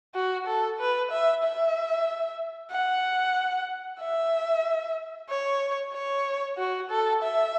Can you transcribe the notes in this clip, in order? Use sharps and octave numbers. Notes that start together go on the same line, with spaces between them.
F#4
A4
B4
E5
E5
F#5
E5
C#5
C#5
F#4
A4
E5